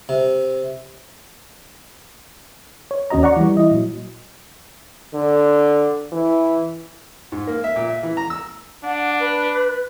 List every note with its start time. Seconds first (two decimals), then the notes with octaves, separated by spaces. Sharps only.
0.09 C3
2.91 C#5
3.10 D#2 C#4 F#4 D#5 A#5
3.23 D5 F#5 A#5 C#6
3.36 E3 G3
3.57 E4 D#5
3.71 A#2 F#3
5.14 D3
6.12 E3
7.32 G#2
7.47 A#3
7.64 E5
7.76 A#2
7.89 E5
8.03 E3
8.17 A#5
8.30 E6
8.84 D4 F#5
9.20 B4